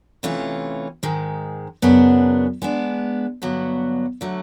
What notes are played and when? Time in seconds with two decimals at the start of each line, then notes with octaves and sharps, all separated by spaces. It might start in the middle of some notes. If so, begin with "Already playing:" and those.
0.23 C3 E3 A3 C#4 F4
1.03 G#2 D#3 G#3
1.82 F#2 C#3 F#3 B3 D4
2.62 G#3 B3 D4
3.42 G2 D3 F#3 B3
4.21 D3 F#3 A3